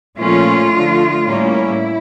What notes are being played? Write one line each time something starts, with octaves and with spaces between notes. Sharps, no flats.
A#2 F3 A3 C#4 F4
D3 F3 A3
A2 G3 A#3 C#4 E4